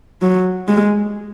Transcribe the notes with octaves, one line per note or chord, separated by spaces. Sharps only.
F#3
G#3